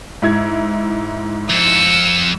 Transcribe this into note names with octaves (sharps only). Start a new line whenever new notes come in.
G#2 E4 G#6
F2 E6 C#7